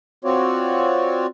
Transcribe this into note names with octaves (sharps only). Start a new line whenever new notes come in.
C4 F4 F#4 C#5 D5